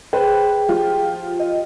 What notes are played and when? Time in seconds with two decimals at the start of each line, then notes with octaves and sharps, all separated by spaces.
0.13 G#4 B4 C5 G5
0.68 F3 F4 G4
1.40 D#5